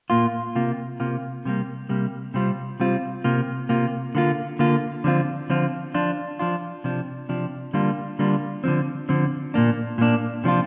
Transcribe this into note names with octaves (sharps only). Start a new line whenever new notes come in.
A#2 A#3 F4
C3 A#3 F4
C3 A#3 F4
C3 G3 A#3
C3 G3 A#3
C3 G3 C4 F4
C3 G3 C4 F4
C3 A#3 F4
C3 A#3 F4
D3 A#3 F4
D3 A#3 F4
D3 F3 C4 F4
D3 F3 C4 F4
F3 D4 F4
F3 D4 F4
C3 F3 D4
C3 F3 D4
D3 G3 A#3 D4 F4
D3 G3 A#3 D4 F4
D3 F3 C4
D3 F3 C4
A#2 A#3 D4
A#2 A#3 D4
C3 F3 D4 F4